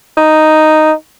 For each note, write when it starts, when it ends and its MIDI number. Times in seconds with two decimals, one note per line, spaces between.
0.17 0.92 63